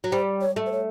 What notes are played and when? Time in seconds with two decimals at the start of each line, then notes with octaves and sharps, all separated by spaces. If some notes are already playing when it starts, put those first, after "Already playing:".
0.04 F#3
0.11 G3 C5
0.41 C#5
0.56 A3
0.66 C5
0.72 C#5